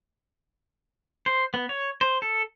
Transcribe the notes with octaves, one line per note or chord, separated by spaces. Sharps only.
C5
B3
C#5
C5
A4